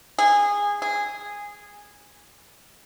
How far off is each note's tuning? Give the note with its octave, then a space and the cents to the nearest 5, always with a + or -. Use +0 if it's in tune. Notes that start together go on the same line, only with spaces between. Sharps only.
G#4 -20
G#4 -10